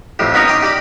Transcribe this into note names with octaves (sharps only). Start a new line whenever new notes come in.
F2 A2 G4
B3 C#4 D#4 A#4 C#5
D#5 G5 C6 D6
G4 D5 B5